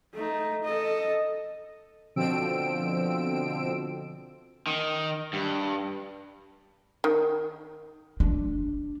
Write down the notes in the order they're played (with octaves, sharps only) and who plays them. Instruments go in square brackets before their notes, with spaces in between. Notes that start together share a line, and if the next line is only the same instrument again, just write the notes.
[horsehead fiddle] A3 D#4
A4 D#5
[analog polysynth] B2 D3 F3 C4 E6 D7
[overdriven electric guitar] D#3
G2
[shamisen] D#3
[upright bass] D4